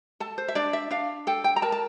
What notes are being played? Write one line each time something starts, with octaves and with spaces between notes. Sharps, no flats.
A4 A5
C5
E5
D4 D5
E5
D4 F5
A4 G5
G5
A#5
A#4 A5
A5